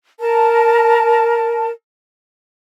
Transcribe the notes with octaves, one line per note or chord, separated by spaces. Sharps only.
A#4 A5